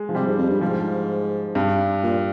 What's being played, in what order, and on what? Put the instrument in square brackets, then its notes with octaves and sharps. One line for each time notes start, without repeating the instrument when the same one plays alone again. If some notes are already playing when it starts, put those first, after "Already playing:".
Already playing: [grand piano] G#3
F3
[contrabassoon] C3 [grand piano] G3
[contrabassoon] G#2
F2
G2
[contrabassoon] G#2 [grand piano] F3
[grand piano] G2
[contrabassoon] A#2